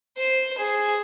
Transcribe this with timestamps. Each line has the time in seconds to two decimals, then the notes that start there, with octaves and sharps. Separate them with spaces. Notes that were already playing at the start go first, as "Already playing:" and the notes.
0.17 C5
0.58 G#4